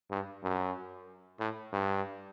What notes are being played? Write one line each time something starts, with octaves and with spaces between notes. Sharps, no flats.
G2
F#2
A2
G2